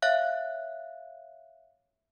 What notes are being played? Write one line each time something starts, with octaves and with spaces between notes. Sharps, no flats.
C#5 E5 F5 F#6